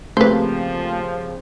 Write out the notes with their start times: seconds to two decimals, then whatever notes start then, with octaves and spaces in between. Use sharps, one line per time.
0.17 C#3 F3 A3 A#3 C4 G4 B4 C5